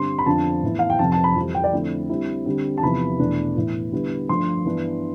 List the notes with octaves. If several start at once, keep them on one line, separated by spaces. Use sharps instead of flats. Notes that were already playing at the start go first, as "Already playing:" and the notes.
Already playing: G2 D3 G3 C4 C6
B5
F2 D3 F3 B3 D4 A5
A2 E3 B3 E4
F5
G5
F2 C3 F3 A5
A5
B5
F2 E3 G3 C4
G5
D5
F2 D3 A3 E4
D3 G3 C4 E4
D3 G3 C4
A5
E2 C3 F3 B3 E4 B5
E2 B2 A3 D4
A2 E3 B3 E4
D3 G3 B3 E4
G2 F3 A3 D4 C6
G2 E3 B3 D4